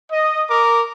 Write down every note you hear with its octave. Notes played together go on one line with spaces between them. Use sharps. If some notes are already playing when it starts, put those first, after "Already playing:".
D#5
A#4 D6